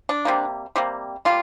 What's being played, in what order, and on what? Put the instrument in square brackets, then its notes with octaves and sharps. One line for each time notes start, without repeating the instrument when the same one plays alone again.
[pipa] D4
C3 G3 A#3
C3 G3 A#3
G3 A#3 F4